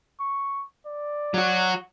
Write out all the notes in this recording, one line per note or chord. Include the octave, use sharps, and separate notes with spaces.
C#6
D5
F#3 F#4